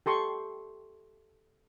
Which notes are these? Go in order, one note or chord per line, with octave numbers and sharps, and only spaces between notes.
G4 A4 C6 C#6